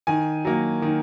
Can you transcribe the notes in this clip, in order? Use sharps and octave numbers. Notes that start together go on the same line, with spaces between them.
D#3 G#5
F#3 A#3
D#3